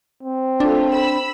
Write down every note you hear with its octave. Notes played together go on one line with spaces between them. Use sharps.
C4
A3 D4 F4
B5 E6